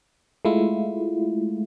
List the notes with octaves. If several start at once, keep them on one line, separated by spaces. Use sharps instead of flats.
G#3 A3 E4 F4